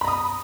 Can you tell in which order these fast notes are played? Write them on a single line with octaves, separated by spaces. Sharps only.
B5 A#5 D#6